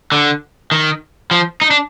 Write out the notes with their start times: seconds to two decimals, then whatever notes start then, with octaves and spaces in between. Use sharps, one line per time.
0.12 D3
0.72 D#3
1.31 F3
1.62 D#4
1.71 D4